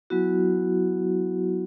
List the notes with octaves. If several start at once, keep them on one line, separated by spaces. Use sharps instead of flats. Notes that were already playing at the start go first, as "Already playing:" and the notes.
F#3 B3 E4 F#4